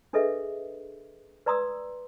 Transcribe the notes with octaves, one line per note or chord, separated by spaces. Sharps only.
D4 G#4 A4 B4 D#5 E5
B4 D5 A#5 C6 D#6 E6